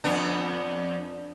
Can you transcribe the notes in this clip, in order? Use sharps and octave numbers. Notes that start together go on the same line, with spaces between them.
F2 B3 D4